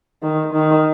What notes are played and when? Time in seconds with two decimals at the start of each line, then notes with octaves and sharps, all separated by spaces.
0.22 D#3
0.53 D#3